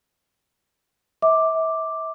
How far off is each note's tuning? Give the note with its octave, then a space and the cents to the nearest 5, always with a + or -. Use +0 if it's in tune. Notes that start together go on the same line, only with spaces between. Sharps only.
E5 -35 D6 +0